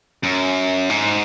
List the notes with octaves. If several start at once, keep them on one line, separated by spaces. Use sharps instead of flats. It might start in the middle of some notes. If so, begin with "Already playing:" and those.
F#2
G#2